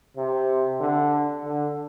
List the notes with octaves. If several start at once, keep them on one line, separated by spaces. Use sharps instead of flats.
C3
D3
D3